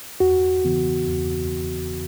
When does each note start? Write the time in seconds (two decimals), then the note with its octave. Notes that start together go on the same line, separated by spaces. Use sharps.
0.20 E2 F#4
0.65 C#3 E3 B3
1.09 E2